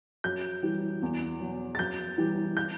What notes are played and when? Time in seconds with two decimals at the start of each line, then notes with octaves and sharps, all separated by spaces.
0.24 F#2 G6
0.63 E3 G3
1.02 E2
1.40 B2 F#3
1.75 A6
1.79 F#2 G6
2.18 E3 G3
2.57 G6